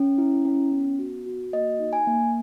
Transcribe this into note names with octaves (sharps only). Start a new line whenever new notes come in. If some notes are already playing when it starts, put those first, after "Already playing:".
Already playing: C#4
E4
C#4
B3
F#4
F#4
A#3 D#5
D#4
G#5
A#3